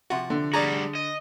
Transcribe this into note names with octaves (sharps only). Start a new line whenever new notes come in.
C3 F3 F#4
D3
G3 F#4 G#4 D5 A5 A#5
D#5